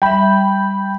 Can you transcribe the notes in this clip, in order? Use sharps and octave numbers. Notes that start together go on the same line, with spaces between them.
G3 E5 G5 B5